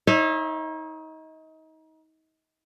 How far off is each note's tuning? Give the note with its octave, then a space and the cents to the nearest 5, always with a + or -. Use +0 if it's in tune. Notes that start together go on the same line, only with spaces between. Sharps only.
D#4 +30 C#5 -35 E5 +0